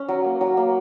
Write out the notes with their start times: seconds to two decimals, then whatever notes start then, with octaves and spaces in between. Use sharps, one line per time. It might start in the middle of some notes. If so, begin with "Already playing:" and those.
Already playing: C#4
0.08 F#3
0.24 A#3
0.41 F#3
0.57 A#3